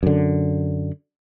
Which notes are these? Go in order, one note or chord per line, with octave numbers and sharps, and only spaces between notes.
F#2 D3